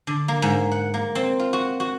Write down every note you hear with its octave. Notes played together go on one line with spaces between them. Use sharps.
D3
A#3
G#2
F#5
A#3
C4
F4
F#4
F#4